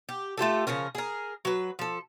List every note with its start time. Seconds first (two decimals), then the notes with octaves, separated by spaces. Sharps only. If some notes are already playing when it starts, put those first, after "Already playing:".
0.09 G4
0.37 A3 F4 G4 A4
0.67 C#3 F3 C#4 A#4
0.95 G#4 A#4
1.45 F#3 B4
1.79 F3 A4